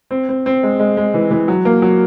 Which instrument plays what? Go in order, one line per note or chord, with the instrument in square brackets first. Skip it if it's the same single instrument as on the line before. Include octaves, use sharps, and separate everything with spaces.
[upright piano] C4
C4
C4
G#3
G#3
G#3
E3
E3
F#3
A#3
F#3